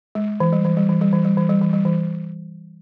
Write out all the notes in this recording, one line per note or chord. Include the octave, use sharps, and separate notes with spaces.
G#3
E3
G3
E3
G3
E3
G3
E3
G3
E3
G3
E3
G3
E3